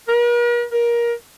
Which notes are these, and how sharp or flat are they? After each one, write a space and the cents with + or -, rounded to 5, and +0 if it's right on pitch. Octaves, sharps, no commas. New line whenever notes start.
A#4 +45
A#4 +20